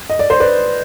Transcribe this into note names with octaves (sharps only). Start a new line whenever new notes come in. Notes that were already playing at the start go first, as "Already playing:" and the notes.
D#5
D5
C5
B4 D5